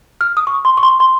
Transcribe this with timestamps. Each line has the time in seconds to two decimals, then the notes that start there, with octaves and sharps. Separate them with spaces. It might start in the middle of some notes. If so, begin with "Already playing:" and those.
0.21 F6
0.37 D#6
0.47 C#6
0.65 C6
0.77 C#6
0.83 C6
1.00 C6